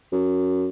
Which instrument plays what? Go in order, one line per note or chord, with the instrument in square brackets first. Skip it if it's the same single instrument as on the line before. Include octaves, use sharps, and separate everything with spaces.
[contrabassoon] F#2